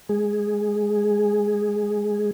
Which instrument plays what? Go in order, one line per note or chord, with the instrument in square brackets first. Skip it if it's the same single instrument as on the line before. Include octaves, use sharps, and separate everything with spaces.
[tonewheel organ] G#3 G#4